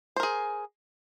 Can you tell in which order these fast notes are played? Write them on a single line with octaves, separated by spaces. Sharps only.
C5 A#4 G#4